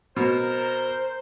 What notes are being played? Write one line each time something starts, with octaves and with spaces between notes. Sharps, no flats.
B2 A#4 C5